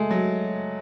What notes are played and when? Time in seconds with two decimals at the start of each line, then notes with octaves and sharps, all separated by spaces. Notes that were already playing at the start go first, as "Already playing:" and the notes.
Already playing: G#3 A3
0.11 F#3